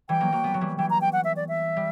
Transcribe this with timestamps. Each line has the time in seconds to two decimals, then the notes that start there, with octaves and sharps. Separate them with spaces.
0.09 E3 G3 G5
0.20 F#3 A#3
0.32 F#3 A#3
0.44 G3 B3
0.54 F#3
0.61 E3 G3
0.78 E3 G5
0.90 A#5
1.01 G5
1.13 F#5
1.24 E5
1.36 D5
1.48 E5
1.76 G3